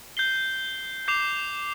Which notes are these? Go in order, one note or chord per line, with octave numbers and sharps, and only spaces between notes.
G6 C7 G7
D6 G6 C7 F7